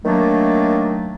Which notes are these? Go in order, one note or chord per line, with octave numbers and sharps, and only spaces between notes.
D#3 F#3 A3 A#3 D4